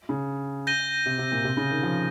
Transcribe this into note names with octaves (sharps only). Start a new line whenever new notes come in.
C#3
G6 A#6 D#7 G7
C3
C3
A#2
C3
C#3
D#3
F3